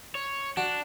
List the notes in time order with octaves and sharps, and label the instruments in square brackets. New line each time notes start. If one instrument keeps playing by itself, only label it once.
[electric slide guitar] C#5
[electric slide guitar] D4 [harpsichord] F#4